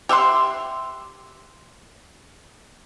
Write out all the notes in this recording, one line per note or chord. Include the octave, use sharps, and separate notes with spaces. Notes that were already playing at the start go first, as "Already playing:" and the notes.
G4 E5 F#5 C6